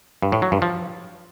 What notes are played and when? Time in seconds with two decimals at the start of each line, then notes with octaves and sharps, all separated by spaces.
0.22 G2
0.32 A2
0.42 F#3
0.52 G2
0.62 F3